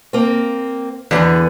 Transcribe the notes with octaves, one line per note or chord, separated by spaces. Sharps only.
A#3 C4
E2 D3 E3 B3 G#4